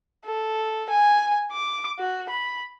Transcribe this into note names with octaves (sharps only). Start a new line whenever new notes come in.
A4
G#5
D6
F#4
B5